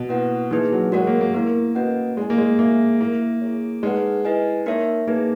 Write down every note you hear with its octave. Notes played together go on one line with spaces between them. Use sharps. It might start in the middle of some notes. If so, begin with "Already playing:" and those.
Already playing: B2
A#3 E4 B4 F#5
E3 A#3 D#4 G#4 B4
F#3
G#3 F#4 A#4 C#5 F#5
A#3
A#3
A#3 B3 E4 A#4
C#4 F#4 B4 D#5 F#5
G#3 E4 G#4 D#5 G#5
A#3
G#3
A#3 D#4 G#4 C#5 E5 G#5
A#3 E4 A#4 E5
E4 G#4 C#5
G#3 D#4 G#4 B4 F#5
E4 B4 D#5 G#5
A#3 D#4 A#4 C#5 E5
A#3 D#4 G#4 B4